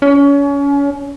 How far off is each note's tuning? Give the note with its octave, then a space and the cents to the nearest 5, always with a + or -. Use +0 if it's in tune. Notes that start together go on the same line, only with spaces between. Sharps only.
C#4 +30